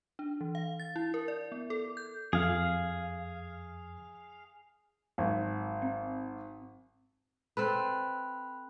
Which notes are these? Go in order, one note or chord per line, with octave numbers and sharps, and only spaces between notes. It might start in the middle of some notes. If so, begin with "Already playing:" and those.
D4
E3
F5
A6
E4
A#4
D5
B3
A4
G6
F2 G#4 F5
G#1 G#2 F#3
C4
C4 A4 B4 B5 F#6